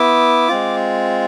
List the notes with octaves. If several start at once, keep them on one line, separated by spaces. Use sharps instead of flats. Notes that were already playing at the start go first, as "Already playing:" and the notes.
Already playing: B3 E4 D6
G#3 C4 F4